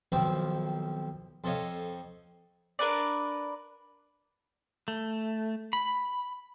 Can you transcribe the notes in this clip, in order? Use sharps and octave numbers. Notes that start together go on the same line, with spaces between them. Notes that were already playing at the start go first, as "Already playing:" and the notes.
B1 D#3 F3 C4 D6
F2 A4 C5 C#5 D#5 F5
D4 A#4 B4 D5
A3
B5